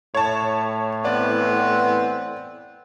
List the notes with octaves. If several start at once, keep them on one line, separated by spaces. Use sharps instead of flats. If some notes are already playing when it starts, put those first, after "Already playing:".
A2 C#5 A5
E3 B3 C4 D5